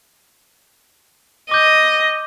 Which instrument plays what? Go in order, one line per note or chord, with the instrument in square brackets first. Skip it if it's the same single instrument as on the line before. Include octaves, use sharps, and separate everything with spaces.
[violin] D#5 [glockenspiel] D6 G6